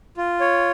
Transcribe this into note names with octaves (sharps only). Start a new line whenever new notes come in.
F4
C#5